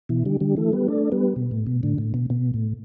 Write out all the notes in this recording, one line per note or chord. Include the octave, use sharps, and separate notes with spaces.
B2 E3
D3 G3
D3 G3
E3 A3
G3 B3
A3 D4
G3 B3
B2
A2
B2
A2 D3
A2
B2
B2
A2